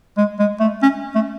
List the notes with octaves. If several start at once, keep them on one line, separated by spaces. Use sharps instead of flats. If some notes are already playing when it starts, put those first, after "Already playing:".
G#3
G#3
A3
C#4
A3